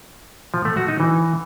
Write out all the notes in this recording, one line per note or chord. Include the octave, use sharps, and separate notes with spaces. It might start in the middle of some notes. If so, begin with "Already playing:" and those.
F3
A3
F#4
D#4
E3